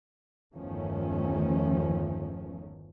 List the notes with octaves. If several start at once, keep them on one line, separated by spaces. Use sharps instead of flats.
G1 E2 D#3 F3 A3 C#4